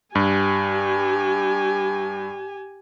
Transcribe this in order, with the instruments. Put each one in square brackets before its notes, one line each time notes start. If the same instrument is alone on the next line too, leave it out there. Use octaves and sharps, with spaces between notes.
[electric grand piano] G2 [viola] G4 G#5